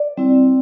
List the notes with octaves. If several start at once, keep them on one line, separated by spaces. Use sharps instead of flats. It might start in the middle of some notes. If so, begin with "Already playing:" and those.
Already playing: D5
G3 C4 E4